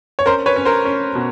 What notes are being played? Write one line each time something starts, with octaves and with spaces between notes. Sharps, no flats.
C#5
C#4 A#4 C5
B4 C#5
C#4
A#4 C5
C#4
B2